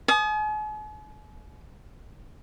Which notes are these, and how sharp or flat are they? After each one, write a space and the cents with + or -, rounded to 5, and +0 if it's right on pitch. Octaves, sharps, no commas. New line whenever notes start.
G#5 +45 D#6 -5